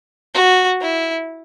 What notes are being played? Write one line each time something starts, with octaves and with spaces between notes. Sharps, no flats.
F#4
E4